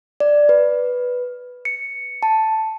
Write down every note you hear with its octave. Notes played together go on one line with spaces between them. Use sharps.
D5
B4
C#7
A5